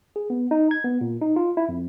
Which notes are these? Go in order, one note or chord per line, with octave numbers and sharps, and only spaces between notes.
G#4
B3
D#4
G#6
B3
A#2
D#4
F4
E4
F2